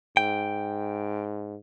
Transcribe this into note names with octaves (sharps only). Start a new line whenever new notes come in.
G#2 G5